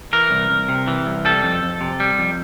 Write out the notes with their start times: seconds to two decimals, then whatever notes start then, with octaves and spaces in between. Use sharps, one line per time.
0.13 E3 A#4
0.31 C2
0.50 C2
0.69 C3
0.87 E3
1.06 C2
1.25 G3 A4
1.43 F2
1.63 F2
1.81 C3
2.00 G3
2.19 F2